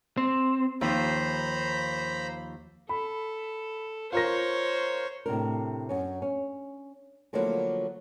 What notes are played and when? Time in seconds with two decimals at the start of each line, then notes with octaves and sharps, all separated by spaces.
0.17 C4
0.81 D#2 F3 C5 A#5 B5
2.89 A4 B5
4.12 F4 A#4 C5 C#5 A#6
5.26 A2 C3 D4 A#4
5.89 F#2 C#4
6.22 C#4
7.33 D3 F3 F#3 A3 A#3 E4